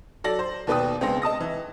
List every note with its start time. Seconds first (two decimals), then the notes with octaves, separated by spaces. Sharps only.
0.24 F#3 A4 D5 A#6 F#7
0.39 C5
0.67 D#2 B2 B4 D5 G5 D#6
1.01 C#2 B3 C4 D4 C6 A#6
1.22 D#5 A5 D#6 A#6
1.41 E3